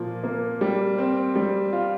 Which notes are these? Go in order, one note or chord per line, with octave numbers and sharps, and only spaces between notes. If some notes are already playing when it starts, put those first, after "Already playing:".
Already playing: A#2 F3 A#3
A#3
G3
C4
G3
F4